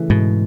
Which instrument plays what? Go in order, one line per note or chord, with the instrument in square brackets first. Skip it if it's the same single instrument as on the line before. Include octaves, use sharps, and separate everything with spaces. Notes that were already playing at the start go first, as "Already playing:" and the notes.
Already playing: [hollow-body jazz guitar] C#3 E3 A3
[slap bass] G#2 B2